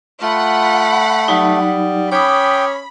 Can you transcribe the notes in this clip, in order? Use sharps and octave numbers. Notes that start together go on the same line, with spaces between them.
A3 F4 F#5 B5
F#3 G3 D#4
C#4 G5 B5 D6 D#6